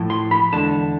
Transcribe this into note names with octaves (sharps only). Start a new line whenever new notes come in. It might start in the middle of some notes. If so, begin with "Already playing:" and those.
Already playing: A2 F3
C6
B5
E2 D3 G#3 A5